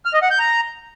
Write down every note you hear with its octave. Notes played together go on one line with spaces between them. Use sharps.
F6
D#5
F#5
G6
A#5